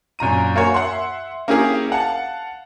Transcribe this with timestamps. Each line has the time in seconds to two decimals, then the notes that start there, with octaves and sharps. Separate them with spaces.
0.19 F#2 A#2 A#5 D#7
0.56 A#3 F#4 C#5 G#5
0.74 E5 F#5 C6
1.48 A#3 C#4 E4 G4 G#4
1.90 F5 F#5 A5